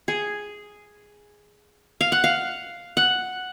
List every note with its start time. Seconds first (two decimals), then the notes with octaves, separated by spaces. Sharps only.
0.08 G#4
2.01 F5
2.12 F#5
2.24 F5
2.97 F#5